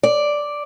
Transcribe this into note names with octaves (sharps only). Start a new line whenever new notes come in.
D5